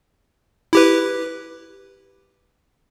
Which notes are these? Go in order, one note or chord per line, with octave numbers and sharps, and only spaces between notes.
E4 G4 B4